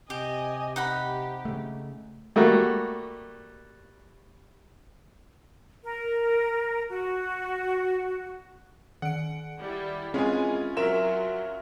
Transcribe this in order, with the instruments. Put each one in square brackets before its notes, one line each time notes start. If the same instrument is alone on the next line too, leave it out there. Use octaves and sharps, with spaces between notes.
[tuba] C3 [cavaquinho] G4 [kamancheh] D#5 G#5
[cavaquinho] D#4 F#5 B5 [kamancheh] G4
[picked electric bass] C#3 A3
[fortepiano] G3 A3 A#3 F#4
[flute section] A#4
F#4
[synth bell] D#3 D7 [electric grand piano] F#5
[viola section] G3 E4
[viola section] E3 G#4 [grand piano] G#3 G#5 [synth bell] C4 [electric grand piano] C#4 F4
[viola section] F#3 [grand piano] A#4 E5 E7 [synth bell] C6